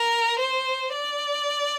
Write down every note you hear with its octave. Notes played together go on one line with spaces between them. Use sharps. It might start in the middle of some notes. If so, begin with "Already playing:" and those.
Already playing: A#4
C5
D5